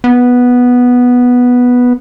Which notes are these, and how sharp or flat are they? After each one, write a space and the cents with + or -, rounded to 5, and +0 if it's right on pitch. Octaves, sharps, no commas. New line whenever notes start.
B3 -5